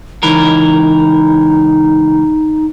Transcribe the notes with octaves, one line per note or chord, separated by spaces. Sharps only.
C#2 E3 D#4 A#4